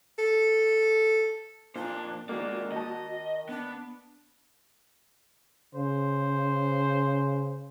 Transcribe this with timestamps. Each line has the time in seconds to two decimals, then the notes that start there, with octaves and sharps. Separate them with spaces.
0.19 A4
1.76 F2 A#2 D4 C5
2.29 D#3 G#3 A#3 F4 F#4 D5
2.72 D#3 D#5 A5
3.49 B3 D4
5.75 C#3 C5